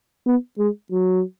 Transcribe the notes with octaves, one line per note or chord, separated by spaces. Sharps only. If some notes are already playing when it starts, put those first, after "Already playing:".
B3
G#3
F#3